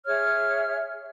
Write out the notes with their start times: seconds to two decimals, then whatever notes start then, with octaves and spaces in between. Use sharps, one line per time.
0.07 G#4 C#5 E5 F6